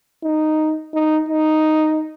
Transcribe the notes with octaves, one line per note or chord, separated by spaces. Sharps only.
D#4
D#4
D#4